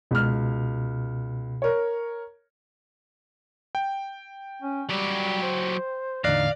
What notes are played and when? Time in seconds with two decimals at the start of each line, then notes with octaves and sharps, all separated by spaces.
0.11 C#2 B2 F6
1.62 A#4 C#5
3.75 G5
4.62 C#4
4.89 F#3 G3 G4
5.42 C5
6.24 E2 A2 D3 D#4 D5 F5 F#6 A#6